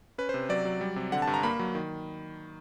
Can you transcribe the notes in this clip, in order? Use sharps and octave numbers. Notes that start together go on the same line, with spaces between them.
C#4 B4
C5
C3
F#3 D5
F#3
G3
C3
D3 F#5
A5
G2
A#5
A#3 B5
F#3
D#3